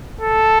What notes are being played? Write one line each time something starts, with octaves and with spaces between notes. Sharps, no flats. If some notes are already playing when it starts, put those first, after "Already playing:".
A4